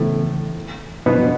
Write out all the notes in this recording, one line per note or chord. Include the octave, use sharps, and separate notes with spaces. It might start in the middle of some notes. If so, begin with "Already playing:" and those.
Already playing: A2 C#3 E3 A3 B3
B2 B3